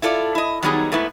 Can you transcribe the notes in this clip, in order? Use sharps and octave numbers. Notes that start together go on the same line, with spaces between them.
E4 F4 A4 A#4 D5
E4 D#5
D#3 F#3 G3 B3 D#4 G#4
G#2 A3 B3 E4